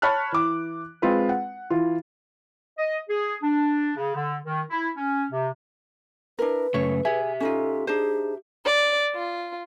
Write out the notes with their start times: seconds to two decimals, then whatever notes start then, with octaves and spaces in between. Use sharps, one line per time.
0.02 C#5 A5 B5 C#6 F6 F#6
0.32 E3 D6
1.02 G#3 C4 F4 B4
1.29 F#5
1.70 E3 F4
2.79 D#5
3.09 G#4
3.42 D4
3.97 C#3
4.15 D3
4.45 D#3
4.70 E4
4.96 C#4
5.31 C3
6.39 D4 E4 A#4 B4
6.74 F#2 C#3 A3 C#5
7.05 G4 G#4 E5
7.40 C#4 D#4 F4 A4
7.87 D4 D#4 G#4 C5
8.64 D5
9.14 F4